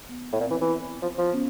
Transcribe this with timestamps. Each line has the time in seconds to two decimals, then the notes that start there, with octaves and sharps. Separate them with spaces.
0.09 B3
0.32 A2
0.40 A#2 C4
0.50 E3
0.61 E3
1.02 F3
1.18 F3
1.34 B3 C#4